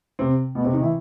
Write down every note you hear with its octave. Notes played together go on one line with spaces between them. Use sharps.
C3 C4
B2 B3
C3 C4
D#3 D#4
E3 E4